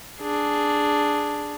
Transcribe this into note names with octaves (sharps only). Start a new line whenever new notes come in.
D4 G#4